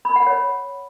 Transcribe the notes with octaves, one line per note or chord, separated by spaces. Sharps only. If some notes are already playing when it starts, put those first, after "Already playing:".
B5
F#5
C#5